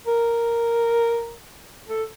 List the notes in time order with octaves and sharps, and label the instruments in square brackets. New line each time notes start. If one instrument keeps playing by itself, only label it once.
[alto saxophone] A#4
A4